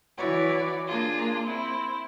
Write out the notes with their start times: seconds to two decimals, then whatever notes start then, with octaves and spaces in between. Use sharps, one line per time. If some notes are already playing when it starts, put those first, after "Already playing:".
0.18 E3 E4 F#4 B4 C#5 D5
0.88 A#3 D4 F4 G#4
1.45 C4 E4